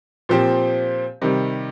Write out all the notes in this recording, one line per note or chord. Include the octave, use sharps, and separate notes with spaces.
A#2 F3 C4 G4 C5
C3 D#3 G3